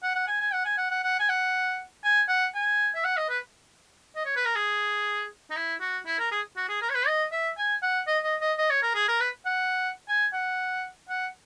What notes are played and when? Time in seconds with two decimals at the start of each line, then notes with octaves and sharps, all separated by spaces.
0.03 F#5
0.15 F#5
0.27 G#5
0.40 G#5
0.53 F#5
0.65 G#5
0.77 F#5
0.91 F#5
1.03 F#5
1.19 G#5
1.29 F#5
2.04 G#5
2.28 F#5
2.54 G#5
2.95 E5
3.04 F#5
3.17 D#5
3.29 B4
4.16 D#5
4.25 C#5
4.36 B4
4.45 A#4
4.55 G#4
5.50 D#4
5.56 E4
5.80 F#4
6.06 E4
6.19 A#4
6.31 G#4
6.56 F#4
6.69 G#4
6.82 A#4
6.89 C#5
6.95 B4
7.07 D#5
7.32 E5
7.57 G#5
7.82 F#5
8.07 D#5
8.24 D#5
8.41 D#5
8.58 D#5
8.70 C#5
8.82 A#4
8.95 G#4
9.08 A#4
9.20 B4
9.45 F#5
10.08 G#5
10.33 F#5
11.09 F#5